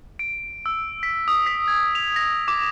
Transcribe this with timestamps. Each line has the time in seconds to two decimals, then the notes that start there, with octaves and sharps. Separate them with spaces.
0.19 D7
0.66 E6
1.03 B6
1.28 D#6
1.46 B6
1.68 G#6
1.95 F7
2.16 A#6
2.48 D6